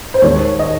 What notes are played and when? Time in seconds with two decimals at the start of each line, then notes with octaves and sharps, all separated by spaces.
0.14 C5
0.22 D#2 D#3 G#3 C#5
0.59 D#5